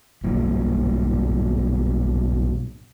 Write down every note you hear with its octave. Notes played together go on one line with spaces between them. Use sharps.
B1 G2 A#2